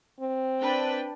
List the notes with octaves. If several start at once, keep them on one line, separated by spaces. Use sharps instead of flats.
C4
D4 B4 G5